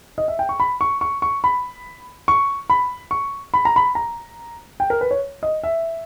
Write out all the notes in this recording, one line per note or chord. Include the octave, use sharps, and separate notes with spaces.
D#5
E5
G5
C#6
B5
C#6
C#6
C#6
B5
C#6
B5
C#6
B5
A#5
B5
A#5
G5
A#4
B4
C#5
D#5
E5